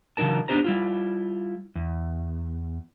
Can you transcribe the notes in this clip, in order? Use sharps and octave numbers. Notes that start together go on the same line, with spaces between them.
C#3 E3 F#3 D#4 A#4 A5
B3 D4 D#4 G4 C5 A#5
G3 E4 F4
E2